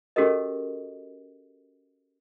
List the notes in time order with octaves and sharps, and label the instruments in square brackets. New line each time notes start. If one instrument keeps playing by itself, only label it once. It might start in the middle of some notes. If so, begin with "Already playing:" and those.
[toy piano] C#4 F#4 G4 A4 A#4 D#5